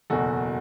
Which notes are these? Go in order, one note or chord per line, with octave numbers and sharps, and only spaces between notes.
F#1 E2 B2 F#4 A4